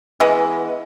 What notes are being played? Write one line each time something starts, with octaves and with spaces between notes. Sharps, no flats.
E3 G#3 B3